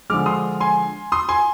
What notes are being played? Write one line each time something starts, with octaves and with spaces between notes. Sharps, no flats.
D3 F3 G#3 D6 F6
C6 D#6
G#5 C6
C6 D#6
G#5 C6